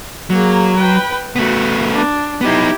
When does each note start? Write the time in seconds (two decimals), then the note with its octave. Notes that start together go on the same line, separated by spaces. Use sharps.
0.30 F#3 A#3 G#4
0.76 B4 G5
1.36 A3 B3 F#4
1.94 D4
2.41 B3 D#4 E4 G4